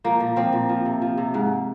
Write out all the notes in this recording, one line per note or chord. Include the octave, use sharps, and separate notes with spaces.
F3 A#3
A#2
F3 C4
A#2
F3
C3
F3
C3
G#2